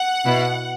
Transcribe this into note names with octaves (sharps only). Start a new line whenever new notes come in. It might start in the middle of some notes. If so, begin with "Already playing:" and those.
Already playing: F#5
B2 B3 E4